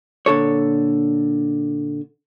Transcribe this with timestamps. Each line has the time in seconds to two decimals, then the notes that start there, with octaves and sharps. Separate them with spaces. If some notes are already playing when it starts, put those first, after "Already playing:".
0.26 A#2 D3 A4 C#5